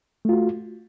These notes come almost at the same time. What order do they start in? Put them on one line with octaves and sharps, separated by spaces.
A3 F4 F#4